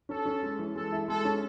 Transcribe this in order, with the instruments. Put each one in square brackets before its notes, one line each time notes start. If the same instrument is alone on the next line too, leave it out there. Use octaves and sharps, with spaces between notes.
[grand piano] C#4 [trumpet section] A4
[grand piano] C#4
G#3
E3
[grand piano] G#3 [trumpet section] A4
[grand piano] E4
[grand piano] G#3 [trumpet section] A4
[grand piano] C#4